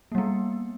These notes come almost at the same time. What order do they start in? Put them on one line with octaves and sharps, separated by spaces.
A#3 G3 B3